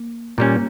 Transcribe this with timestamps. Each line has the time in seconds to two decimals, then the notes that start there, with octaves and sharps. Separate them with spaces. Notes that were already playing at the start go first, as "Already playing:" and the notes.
Already playing: A#3
0.38 A#2 G3 A#3 C#4